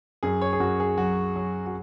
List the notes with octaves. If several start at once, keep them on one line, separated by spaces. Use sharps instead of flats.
F#2 G#4
C#5
G#4
F#2 F#4
G#4
F#3 F#4
F#3
F#4